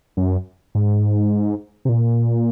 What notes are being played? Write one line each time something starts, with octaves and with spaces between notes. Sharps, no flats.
F#2
G#2
C3
A#2